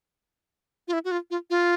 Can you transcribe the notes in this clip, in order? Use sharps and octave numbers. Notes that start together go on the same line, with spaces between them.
F4
E4
F#4
F4
F4
F4